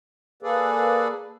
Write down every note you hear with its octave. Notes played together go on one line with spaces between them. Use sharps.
A#3 G#4 A4 B4 D5